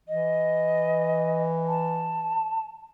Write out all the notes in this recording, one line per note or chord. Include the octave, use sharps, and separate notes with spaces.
E3 D#5
A5